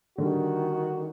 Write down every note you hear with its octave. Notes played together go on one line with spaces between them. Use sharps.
D3 D#3 G3 F#4